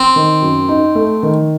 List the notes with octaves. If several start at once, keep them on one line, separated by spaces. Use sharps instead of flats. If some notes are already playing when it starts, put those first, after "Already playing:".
Already playing: C4
D#3
F#2
D#4
A3
D#3